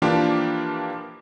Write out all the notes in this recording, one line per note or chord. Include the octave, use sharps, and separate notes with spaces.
E3 F3 A#3 D4 F4 G4